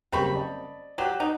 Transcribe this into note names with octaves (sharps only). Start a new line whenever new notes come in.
F#1 G3 C4 A#4 B5 C#6
D5 D#5 A5
F#3 G4 F#6
D#4 F#5